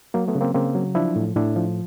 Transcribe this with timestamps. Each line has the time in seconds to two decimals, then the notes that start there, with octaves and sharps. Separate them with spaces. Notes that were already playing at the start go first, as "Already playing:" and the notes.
0.14 F#3 A#3
0.28 A3 B3
0.35 C#3
0.41 A#3 C4
0.55 C#3 A#3 C4
0.75 F#3
0.95 F3 D4 E4
1.16 A2
1.36 A2 D4 E4
1.56 F3